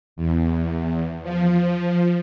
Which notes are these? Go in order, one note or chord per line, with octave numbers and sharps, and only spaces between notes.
E2
F3